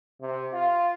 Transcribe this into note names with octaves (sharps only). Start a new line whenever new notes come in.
C3
F4